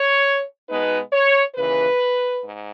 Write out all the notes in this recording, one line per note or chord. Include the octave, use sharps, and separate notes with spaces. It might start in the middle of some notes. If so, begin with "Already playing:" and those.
Already playing: C#5
B2 G#3 B3 D#4 B4
C#5
D#2 C#3 E3 B4
G#2